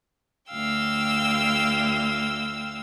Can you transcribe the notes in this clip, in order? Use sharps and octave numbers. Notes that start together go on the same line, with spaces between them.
D2 F5 G5 E6